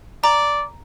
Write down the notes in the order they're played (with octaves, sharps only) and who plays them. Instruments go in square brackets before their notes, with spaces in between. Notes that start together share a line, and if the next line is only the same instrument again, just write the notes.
[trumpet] D5 [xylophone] A#5